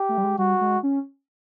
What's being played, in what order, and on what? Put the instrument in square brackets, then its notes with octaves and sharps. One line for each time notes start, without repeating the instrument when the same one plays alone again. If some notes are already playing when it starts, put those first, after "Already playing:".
Already playing: [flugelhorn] G4
[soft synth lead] A3
G3
G#3
[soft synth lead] G3 [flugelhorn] F#4
[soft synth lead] G#3
C#4